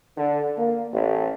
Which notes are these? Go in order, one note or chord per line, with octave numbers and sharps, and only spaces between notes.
D3
A#3
A1